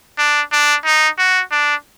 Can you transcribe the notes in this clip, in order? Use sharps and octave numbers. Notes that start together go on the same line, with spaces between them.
D4
D4
D#4
F#4
D4